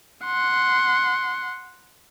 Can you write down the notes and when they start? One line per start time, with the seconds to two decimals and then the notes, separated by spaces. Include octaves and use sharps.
0.24 F#5 C6